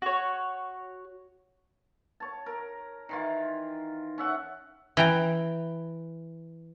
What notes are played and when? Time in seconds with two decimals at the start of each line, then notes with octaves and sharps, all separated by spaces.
0.02 F#4 C#5
2.20 C#5 A5
2.46 A#4
3.09 D#3 E3 F4
4.18 C#4 E5 F#5
4.97 E3 G5 A#5